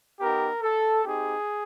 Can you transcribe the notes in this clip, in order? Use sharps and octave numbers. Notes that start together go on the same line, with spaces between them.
B3 D#4 G4 A#4
A4
C4 D#4 G4 G#4